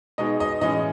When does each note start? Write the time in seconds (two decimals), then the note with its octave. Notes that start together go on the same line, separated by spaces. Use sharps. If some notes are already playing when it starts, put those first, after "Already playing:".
0.18 B2 G#3 D#4 D#5
0.40 D#5
0.61 A2 E3 G#3 C#4 D#5